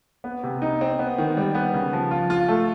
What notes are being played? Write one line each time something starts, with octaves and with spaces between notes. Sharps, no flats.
B3
C3
D#4
C4
B3
D#3
G3
B3
C#3
F3
F4
F4
A3